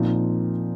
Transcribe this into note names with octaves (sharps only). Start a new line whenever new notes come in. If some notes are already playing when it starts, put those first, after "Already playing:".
Already playing: A#2 F3 C4 D#4